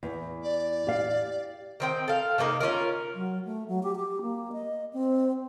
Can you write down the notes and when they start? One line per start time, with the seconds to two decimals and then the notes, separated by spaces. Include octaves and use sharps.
0.03 E2
0.43 D5
0.87 G4 F5
1.80 D#3 C4 G5
2.08 A4 F5
2.38 C3 A3 A#3 D#4
2.60 C#4 D4 F4 A#4
3.15 F#3
3.45 A3
3.68 F#3
3.83 G4
3.96 G4
4.22 A#3
4.53 D#5
4.93 C4